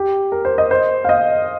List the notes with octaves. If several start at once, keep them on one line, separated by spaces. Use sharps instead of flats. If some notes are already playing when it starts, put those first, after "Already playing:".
Already playing: G4
A#4
C5
D#5
C5
F5
D#5